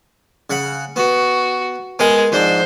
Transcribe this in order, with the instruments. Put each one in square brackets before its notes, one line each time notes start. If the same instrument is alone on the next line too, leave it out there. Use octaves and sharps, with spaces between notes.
[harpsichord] C#3 F#5 B5
[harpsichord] B3 [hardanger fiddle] F#4
[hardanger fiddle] G#3 [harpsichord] B3 A#4 G#5
[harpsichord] F2 G#2 D4 [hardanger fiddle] C5